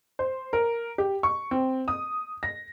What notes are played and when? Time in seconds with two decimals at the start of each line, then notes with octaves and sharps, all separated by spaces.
0.19 C5
0.53 A#4
0.98 G4
1.23 C#6
1.51 C4
1.88 D#6
2.43 A#6